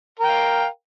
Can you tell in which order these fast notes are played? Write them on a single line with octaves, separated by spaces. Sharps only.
A#4 G5 F5